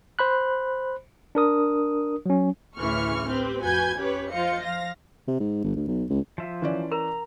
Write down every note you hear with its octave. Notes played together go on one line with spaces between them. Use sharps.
C5 B5 F#6
D4 A#4 D#6
F#3 C#4
A1 D2 C#3 E3 C#6 F6
C4 G4 B4
F2 F#4 B4 G#5 G6 G#6
C#4 G4 B4 C#5
F3 F4 C5 D#5 F5 C#7
F3 F5 A#6
C3
G#2
G1
D2
B1
C#2
F3 E5
E3 C#4 D5
A#4 A#5